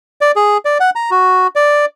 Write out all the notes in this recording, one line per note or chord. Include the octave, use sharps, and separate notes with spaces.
D5
G#4
D5
F#5
A#5
F#4
D5